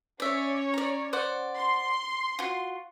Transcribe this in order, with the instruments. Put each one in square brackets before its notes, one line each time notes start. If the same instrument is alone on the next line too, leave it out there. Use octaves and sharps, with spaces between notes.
[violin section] C#4 C#5 [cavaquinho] D5 E5
[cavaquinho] D5 A#5
C5 D5 F#5
[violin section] C6
[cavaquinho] F4 F#4